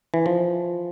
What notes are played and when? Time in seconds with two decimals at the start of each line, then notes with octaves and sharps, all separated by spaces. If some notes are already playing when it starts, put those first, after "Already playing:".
0.14 E3
0.26 F3